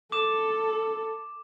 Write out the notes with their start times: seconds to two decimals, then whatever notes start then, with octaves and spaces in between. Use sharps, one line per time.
0.12 A4 D6 E7